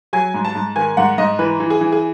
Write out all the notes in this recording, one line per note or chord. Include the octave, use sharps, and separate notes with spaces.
F#3 G#5
G#2
A5
G#2
D#3 G#5
G#2 F#5
G#2 D#5
E3 B4
E3
G#4
E3
G#4